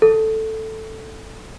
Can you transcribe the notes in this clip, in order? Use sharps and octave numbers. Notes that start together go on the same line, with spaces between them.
A4